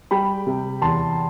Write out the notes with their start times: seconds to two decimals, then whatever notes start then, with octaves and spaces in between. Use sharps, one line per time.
0.11 G3 G5 B5
0.47 C3
0.82 E2 A5 C6